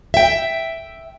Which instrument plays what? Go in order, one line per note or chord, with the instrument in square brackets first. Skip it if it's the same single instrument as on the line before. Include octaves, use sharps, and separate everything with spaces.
[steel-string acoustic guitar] E5 G5